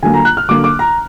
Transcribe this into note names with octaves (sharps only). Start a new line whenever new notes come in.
D3 F#3 A#3 G#5
A#5
F#6
F6
D3 F#3 A#3 D6
D6
A#5